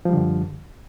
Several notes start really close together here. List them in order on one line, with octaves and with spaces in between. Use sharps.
F3 G3 D3 F#2